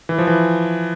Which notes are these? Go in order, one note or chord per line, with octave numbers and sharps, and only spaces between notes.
E3
F3
E3